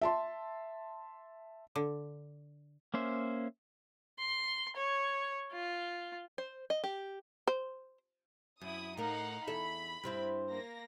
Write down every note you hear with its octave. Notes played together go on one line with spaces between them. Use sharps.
E5 A5 C6
D3
A#3 C#4 C5 E5
C6
C#5
F4
C5
D#5
G4
C5
F#2 E4 D#6
A2 D#4 A#4 F5 F#5
E2 A4 E5 B5
G2 C4 E4
A#3 A#6